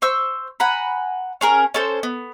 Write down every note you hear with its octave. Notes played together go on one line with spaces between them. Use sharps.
C5 C#6 E6
F#5 G#5 A#5 B5
C#4 G#4 A#4
C#4 A4 C5
B3